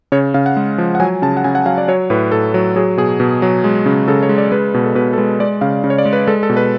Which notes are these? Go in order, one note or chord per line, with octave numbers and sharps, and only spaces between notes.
C#3 C#5
C#3 F5
F#5
G#3
F3
F#5
F#3 G#5
C#3 A5
F#5
C#3 G#5
F#5
F#3 F5
D5
F#3 C#5
A2 B4
A2 A4
F#3
F#3 G#4
B2 G#4
B2
F#3
G#3
C#3
C#3 A4
C#5
G#3
D5
G#3 B4
B2
A4
B2 B4
A4
G#3 B4
G#3 D5
C#3 F5
C#3
C#5
D5
G#3
B4
G#3 A4
A4
B2
B4